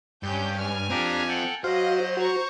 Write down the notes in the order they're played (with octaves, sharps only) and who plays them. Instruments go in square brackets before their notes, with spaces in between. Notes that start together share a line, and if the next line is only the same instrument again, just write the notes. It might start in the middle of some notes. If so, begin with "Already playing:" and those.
[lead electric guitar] G2 [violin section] C#4 G4 G6
[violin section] G#5 F6
[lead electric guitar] C4 F4 [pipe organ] D4 G4 A#5
[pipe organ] A4 F#5 G5
[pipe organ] F#3 [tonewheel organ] F#4 F5 [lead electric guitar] C5 [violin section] D#5
[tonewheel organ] F#4 [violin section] A#5 C#6